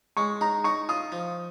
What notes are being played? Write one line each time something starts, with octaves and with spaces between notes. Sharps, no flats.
G#3 C#6
D#4 A#5
D#4 C#6
F4 D#6
F3